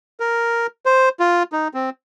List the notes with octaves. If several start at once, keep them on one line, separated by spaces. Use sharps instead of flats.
A#4
C5
F4
D#4
C4